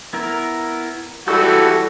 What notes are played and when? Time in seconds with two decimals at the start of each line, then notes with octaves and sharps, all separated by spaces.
0.13 B3 E4 A#4
1.28 E3 G3 F#4 A4 A5 E6 G6